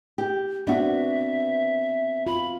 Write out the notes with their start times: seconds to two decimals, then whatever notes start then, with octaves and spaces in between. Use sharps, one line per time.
0.18 G4
0.67 B3 C4 D4 F#4 E5
2.26 F4 B5